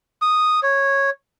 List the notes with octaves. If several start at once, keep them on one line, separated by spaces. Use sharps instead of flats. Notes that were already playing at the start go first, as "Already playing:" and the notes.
D#6
C#5